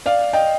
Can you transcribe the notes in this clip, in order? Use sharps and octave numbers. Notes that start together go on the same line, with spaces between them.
D5 F5
D#5 G5